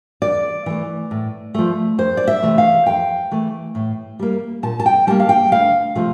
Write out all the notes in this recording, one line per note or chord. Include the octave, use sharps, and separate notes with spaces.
E2 D5
E3 A3
A2
F3 A3
F2 C5
D5
E5
C3 E3 A3
F5
F2 G5
E3 A3
A2
G3 A#3
A#2 A5
A5
G5
G3 A#3 A5
F5
G5
D2 F5
C3 F3 A3